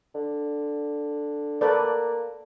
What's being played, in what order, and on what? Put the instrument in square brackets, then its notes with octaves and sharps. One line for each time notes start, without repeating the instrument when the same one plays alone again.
[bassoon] D3
[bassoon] A#3 [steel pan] A4 B4 D5